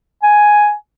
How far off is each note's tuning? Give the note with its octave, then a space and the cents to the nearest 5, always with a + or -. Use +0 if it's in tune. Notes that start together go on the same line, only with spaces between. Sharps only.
G#5 +5